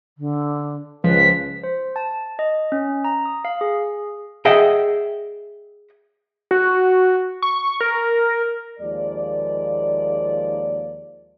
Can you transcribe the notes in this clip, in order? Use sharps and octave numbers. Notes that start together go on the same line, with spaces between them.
D3
C#2 F3 B4 B6
C5
A5
D#5
C#4
A#5
D#6
F5
G#4
G#4 D#5 E5 F#5 G5
F#4
C#6
A#4
D#2 F3 G#3 A#3 D5